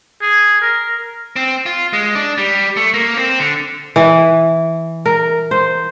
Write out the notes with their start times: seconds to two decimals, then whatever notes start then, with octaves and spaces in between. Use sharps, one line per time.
0.22 G#4
0.61 A#4
1.36 C4
1.66 F4
1.93 G#3
2.15 D4
2.38 G3
2.77 A3
2.94 A#3
3.17 C4
3.39 D3
3.96 E3
5.06 A#4
5.51 C5